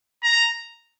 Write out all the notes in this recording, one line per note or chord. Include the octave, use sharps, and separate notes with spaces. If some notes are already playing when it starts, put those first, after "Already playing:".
A#5